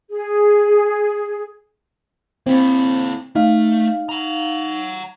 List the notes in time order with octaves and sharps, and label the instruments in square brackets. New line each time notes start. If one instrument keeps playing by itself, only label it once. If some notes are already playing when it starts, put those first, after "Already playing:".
[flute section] G#4
[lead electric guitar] A#3 E4 [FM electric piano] C4
[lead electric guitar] A3 [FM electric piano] D#4 F5
[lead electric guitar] F#5 A#5